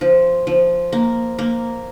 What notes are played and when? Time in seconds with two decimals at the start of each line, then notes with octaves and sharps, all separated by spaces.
0.01 F3
0.47 F3
0.92 A#3
1.39 A#3